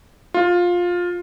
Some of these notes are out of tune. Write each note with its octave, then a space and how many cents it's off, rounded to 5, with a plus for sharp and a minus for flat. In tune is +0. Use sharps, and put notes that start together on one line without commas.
F4 +15